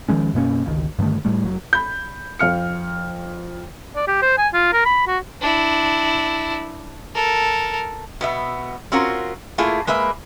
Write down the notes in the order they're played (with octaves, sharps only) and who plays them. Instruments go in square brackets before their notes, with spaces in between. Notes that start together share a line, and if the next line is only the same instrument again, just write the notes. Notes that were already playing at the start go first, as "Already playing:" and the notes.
[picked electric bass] D#3 F3 G#3 C#4
F#2 B2 A#3 C#4
G1 C#2 D#3
G2 D3 D#3 A3
A2 G3 A3
F1 F#3
[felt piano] B5 G6
F2 F5 F6 C#7
[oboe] D5
G4
C5
G#5
F4
A#4
B5
F#4
[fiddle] D4 E4
A4 A#4
[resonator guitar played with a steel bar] B2 B3 E5
C4 C#4 F4 F#4 A#4
A3 A#3 E4 F4 G#4
G#3 A#3 B4 E5